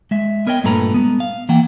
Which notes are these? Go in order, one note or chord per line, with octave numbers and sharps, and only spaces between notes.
G#3 E5
B3 A#4 C#5 D#5 G5
G2 A#2 A3 A4 B4 A#5
G#3 B3
F5
E3 A#3 F#5 G5